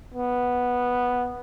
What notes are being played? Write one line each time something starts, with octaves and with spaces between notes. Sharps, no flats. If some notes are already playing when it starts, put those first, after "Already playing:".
B3